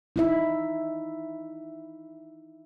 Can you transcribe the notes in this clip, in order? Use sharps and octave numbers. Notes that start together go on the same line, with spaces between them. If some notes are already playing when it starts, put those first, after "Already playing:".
D#4 E4 E5